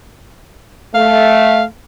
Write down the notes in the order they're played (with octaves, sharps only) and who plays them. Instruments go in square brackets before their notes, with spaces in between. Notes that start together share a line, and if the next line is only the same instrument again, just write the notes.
[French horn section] A3 [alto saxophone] F5